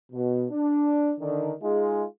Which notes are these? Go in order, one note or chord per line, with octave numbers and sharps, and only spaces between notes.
B2
D4
D3 D#3 D4
G#3 D#4 F4 G#4